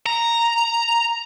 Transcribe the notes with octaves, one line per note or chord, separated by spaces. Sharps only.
A#5